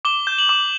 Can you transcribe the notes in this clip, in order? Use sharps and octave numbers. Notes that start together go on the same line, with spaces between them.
D6 G7
G6
F#7
D6